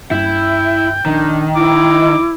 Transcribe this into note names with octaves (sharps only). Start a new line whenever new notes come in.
G2 A#3 C#4 E4 G5
A#1 D#3 D4
E4 D6